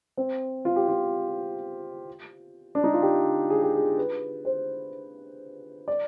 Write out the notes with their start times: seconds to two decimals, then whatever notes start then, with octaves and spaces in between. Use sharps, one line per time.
0.17 C4
0.65 F4
0.76 G4
0.88 F4
2.75 D4
2.84 D#4
2.93 F4
3.02 G4
3.50 G#4
3.62 G4
3.75 G#4
3.97 B4
4.45 C5
5.88 D5